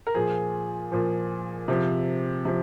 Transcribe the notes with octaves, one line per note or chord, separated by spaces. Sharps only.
A#4
A#2 F3 G#4
A#2 F3
C3 F3
C3 F3